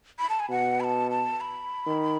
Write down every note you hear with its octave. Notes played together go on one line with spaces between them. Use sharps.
B5
A5
G#5
B2 F#5
B5
A5
A5
B5
D#3